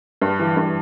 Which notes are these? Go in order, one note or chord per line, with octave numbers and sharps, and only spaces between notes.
G2
E3
G2